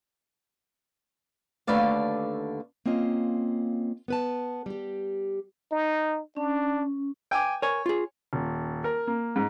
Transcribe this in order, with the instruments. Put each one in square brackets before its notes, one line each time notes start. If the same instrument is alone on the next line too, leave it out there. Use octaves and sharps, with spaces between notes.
[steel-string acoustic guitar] D#2 D3 A3 B4 D5 F5
A#3 C4 C#4 F4 D#5
B3 B4 A5
G3 G4
[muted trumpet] D#4
[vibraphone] C#4 [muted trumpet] D4
[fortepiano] G5 G#5 D6
[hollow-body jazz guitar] A#4 G#5 [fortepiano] C#5
[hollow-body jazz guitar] F4 G#4
[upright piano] D#1
A#4
A#3
G#2